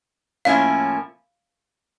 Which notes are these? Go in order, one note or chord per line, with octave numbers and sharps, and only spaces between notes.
A2 F3 A#3 C#4 E4 F5